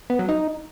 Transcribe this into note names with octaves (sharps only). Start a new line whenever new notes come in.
B3
F#3
D#4